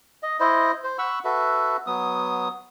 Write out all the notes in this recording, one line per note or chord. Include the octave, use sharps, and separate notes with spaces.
D#5
E4 C5 D#5
C5
F#5 B5 C#6 E6
F#4 A4 B4 E5
F#3 B3 D#6